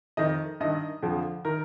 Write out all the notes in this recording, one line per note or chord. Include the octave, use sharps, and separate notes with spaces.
F2 D#3 D#5
G2 D#3 D#5
F2 D3 F3
D#3 A#4